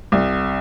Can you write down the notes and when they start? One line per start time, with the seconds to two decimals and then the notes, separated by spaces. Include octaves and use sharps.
0.12 C2